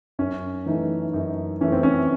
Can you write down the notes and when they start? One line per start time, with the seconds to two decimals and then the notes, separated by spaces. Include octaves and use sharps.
0.19 F#2 C#4
0.66 E3 A3 D#4
1.13 F#2 D#4
1.61 E3 A3 C#4
1.72 C4
1.83 C#4